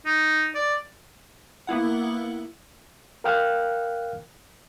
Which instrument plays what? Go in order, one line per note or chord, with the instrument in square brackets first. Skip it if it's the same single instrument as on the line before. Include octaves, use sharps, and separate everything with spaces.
[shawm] D#4
D5
[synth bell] A#3 B3 E4 F#5
[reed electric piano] A#4 F5 G5 F6 F#6